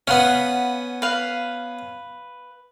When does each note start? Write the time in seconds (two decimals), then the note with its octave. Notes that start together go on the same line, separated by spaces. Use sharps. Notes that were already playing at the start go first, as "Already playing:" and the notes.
0.07 B3 C#4 F5 F#5 B5
1.02 B4 F5